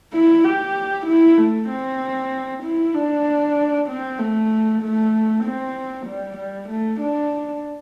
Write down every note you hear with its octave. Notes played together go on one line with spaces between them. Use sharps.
E4
G4
E4
A3
C4
E4
D4
C4
A3
A3
C4
G3
G3
A3
D4